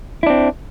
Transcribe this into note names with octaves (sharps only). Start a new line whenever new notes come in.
C4 D4 E4